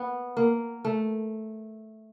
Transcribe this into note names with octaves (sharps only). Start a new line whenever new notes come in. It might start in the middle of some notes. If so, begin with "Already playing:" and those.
Already playing: B3
A#3
A3